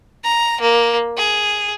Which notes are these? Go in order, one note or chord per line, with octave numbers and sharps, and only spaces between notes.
A#5
A#3
G#4